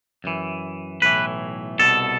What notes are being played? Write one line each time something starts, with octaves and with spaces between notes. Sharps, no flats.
F#2 E3
B1 A2 E3 B4
C2 B2 A4